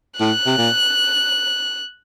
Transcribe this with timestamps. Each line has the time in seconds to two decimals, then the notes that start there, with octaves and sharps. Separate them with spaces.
0.20 A2 F#6
0.46 C3
0.58 A#2